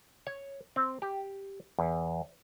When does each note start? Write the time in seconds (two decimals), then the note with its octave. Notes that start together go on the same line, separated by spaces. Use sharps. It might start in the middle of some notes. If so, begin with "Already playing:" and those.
0.27 C#5
0.76 C4
1.02 G4
1.79 E2